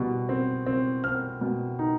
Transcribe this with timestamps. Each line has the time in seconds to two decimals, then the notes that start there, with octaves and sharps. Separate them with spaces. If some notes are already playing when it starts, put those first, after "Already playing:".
Already playing: B2 G3
0.29 C4
0.66 C4
1.04 C4 F6
1.41 B2
1.79 D#4